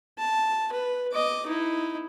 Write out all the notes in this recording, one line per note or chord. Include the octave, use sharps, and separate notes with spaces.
A5
B4
D#5 D6
D#4 E4